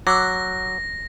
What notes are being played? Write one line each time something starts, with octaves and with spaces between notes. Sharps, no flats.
F#3 D6 E6 F#6 A#6